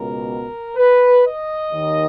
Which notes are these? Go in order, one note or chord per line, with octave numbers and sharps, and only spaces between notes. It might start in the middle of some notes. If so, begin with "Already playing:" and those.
Already playing: C#2 B2 A#4
B4
D#5
D#2 D#3